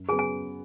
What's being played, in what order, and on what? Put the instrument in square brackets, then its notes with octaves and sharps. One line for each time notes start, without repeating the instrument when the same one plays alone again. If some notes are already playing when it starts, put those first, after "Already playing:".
Already playing: [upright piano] F#2
[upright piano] C#3 F#3 B3 [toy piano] G#4 G#5
[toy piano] G#5